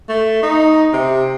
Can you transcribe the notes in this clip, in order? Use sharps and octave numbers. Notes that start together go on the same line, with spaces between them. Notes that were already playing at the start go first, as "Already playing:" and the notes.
A3
D#4
C3